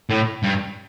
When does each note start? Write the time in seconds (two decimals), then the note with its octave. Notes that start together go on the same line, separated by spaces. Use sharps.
0.10 A2
0.43 G2